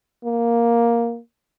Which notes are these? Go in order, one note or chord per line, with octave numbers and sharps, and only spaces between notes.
A#3